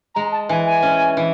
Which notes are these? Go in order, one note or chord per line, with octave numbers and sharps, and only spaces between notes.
G#3 A#5
A5
E3 G#5
G#5
C#4
E3